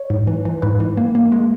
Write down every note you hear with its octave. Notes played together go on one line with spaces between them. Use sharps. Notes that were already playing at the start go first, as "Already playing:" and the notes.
Already playing: C#5
G#2
E3
E3
G#2 B4
E3
A#3
A#3
G#3